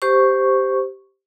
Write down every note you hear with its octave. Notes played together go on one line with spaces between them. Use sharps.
G4 C5 C#6